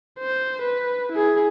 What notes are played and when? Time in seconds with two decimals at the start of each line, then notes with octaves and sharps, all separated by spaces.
0.19 C5
0.62 B4
1.12 E4 G#4